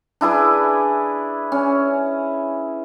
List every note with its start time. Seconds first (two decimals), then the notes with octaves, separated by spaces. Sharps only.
0.21 D4 E4 G#4 B4
1.52 C#4